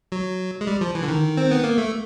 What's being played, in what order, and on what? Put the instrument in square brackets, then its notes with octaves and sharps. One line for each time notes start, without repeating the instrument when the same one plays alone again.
[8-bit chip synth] F#3
G#3
G3
F3
E3
D3
D#3
C4
B3
A#3
A3